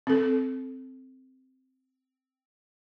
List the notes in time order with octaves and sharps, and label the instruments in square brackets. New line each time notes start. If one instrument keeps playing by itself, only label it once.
[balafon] C4 A4